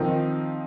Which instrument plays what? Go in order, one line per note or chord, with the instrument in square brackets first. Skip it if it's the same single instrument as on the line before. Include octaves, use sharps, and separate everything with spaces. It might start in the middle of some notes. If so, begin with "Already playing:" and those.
Already playing: [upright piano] D#3 [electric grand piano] F3 C4 D#4